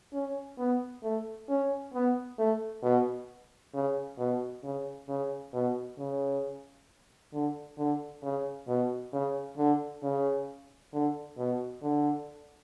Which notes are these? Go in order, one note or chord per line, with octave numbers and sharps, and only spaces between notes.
C#4
B3
A3
C#4
B3
A3
B2
C#3
B2
C#3
C#3
B2
C#3
D3
D3
C#3
B2
C#3
D3
C#3
D3
B2
D3